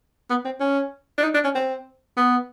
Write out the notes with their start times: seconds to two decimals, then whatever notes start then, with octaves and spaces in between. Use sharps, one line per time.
0.30 B3
0.45 C4
0.60 C#4
1.18 D4
1.23 D#4
1.34 D4
1.44 C#4
1.55 C4
2.17 B3